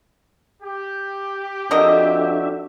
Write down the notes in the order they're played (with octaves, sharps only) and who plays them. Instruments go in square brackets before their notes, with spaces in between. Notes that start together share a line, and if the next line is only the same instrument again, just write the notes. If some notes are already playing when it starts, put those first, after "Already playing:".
[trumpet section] G4
[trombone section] F2 F#4 A4 [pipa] D3 A#4 D#5 [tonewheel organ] D4 E5